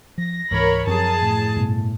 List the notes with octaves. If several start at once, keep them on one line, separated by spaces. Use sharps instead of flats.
F3 A#6
C#2 G#2 E3 A#4 C#5 B5
F#2 F3 C4 G#4 A#4 A5
A2
G2 B2